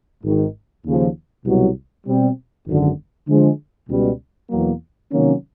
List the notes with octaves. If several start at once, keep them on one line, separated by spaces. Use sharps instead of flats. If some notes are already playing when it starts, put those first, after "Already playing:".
G#1 G#2 D#3
D#2 C#3 F3
C2 B2 F#3
B2 G3 C4
G#1 F#2 D3
D3 F3 G#3
C#2 B2 G3
E2 B2 F#3 A#3
C3 D#3 F#3 A#3 C#4